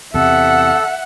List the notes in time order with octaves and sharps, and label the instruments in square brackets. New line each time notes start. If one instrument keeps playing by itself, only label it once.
[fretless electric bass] E2 C3 [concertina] A4 [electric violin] E5 F#5